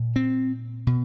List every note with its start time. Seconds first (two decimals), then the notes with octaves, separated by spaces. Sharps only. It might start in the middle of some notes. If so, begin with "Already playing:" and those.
Already playing: A#2
0.16 C4
0.87 B2